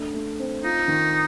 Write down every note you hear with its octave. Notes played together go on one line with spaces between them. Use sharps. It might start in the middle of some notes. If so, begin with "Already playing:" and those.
Already playing: A3 D4
A3
C4
D#4 F4
D#3